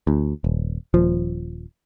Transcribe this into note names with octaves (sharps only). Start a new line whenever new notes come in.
D2
D#1
D#1 F3